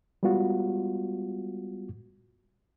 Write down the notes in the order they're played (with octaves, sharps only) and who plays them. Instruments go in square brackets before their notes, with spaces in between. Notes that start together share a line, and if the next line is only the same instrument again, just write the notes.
[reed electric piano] G3 G#3 B3 F4 F#4